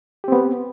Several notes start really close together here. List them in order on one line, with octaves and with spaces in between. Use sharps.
G4 C4 B3